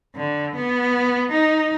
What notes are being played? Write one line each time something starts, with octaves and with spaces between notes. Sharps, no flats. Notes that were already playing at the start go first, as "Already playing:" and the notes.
D3
B3
D#4